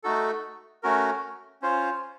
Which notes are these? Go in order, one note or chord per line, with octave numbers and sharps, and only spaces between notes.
A3 D#4 F#4 A4
A3 C#4 F#4 A#4
C#4 F4 C5